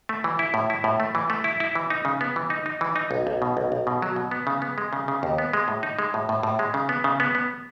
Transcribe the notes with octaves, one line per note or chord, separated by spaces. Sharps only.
A3
E3
E4
A2
E4
A2
A3
E3
A3
E4
E4
E3
D#4
C#3
B3
E3
D#4
D#4
E3
D#4
B1
B1
B2
B1
B1
B2
F#3
B2
B3
C#3
B3
G#3
C#3
C#3
D#2
B3
G#3
A2
D#4
G#3
A2
A2
A2
G#3
C#3
B3
C#3
B3
B3